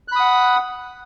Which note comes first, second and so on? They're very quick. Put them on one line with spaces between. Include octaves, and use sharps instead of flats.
F#6 B5 D#6 F#5